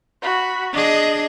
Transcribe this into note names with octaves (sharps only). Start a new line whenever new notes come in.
F#4 B5
D4 G#4 D#5